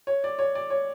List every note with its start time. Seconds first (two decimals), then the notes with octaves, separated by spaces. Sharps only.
0.07 C#5
0.24 D5
0.39 C#5
0.55 D5
0.70 C#5